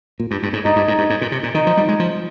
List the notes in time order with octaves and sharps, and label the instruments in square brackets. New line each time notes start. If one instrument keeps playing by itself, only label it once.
[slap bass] A#2
G2
G2
G#2
[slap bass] G2 [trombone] D#4
[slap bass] G2
G#2
G2
G#2
A#2
C3
A#2
[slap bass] D#3 [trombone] D#4
[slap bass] F3
G3
G#3
F3